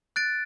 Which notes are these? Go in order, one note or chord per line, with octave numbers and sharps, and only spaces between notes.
F#6 A6 D7